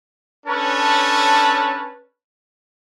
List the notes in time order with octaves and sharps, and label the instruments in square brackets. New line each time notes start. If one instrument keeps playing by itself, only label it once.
[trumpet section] C#4 D4 A4 B4 C#5 A5